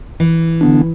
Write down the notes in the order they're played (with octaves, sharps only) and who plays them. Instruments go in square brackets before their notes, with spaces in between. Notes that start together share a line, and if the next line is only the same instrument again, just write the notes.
[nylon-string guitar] E3
[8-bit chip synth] D3 B3 D4